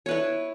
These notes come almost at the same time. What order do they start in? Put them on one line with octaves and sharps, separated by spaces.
C#5 B4 E4